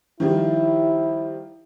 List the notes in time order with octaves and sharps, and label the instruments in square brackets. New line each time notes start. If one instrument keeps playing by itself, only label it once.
[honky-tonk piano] D#3 F3 G3 [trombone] E4